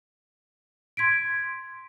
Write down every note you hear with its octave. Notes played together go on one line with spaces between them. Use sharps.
C6 G#6 B6 D7